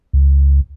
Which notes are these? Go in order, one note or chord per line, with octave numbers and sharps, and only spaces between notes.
C#2